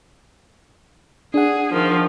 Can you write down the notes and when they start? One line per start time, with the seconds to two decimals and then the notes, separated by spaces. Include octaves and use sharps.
1.34 D4 G#4 F#5
1.73 D#3 F3